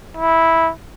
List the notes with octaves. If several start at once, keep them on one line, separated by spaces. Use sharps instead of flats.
E4